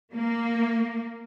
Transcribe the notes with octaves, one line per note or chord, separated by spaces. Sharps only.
A#3